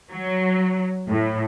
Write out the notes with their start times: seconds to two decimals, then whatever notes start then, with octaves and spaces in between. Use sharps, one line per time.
0.11 F#3
1.09 A2